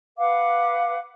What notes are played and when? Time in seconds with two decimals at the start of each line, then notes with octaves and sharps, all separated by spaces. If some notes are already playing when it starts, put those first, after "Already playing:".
0.18 B4 F5 F#5 D6